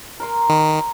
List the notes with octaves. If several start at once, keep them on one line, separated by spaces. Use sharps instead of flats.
A#4 A#5 C6
D#3